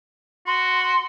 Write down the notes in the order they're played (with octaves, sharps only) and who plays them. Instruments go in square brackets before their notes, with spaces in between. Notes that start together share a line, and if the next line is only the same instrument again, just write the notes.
[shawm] F#4 [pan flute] C6